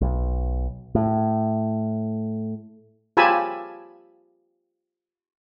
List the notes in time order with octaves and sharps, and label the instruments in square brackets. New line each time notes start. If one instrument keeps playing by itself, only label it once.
[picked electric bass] B1
A2
[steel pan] F4 G4 G#5 A5 B5 E6